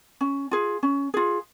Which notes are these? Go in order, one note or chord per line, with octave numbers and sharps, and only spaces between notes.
C#4
F4 G#4
C#4
F4 G#4